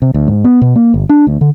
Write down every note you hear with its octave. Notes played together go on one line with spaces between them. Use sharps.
C3
D2
G#2
B3
B2
A#3
G1
D4
D2
D3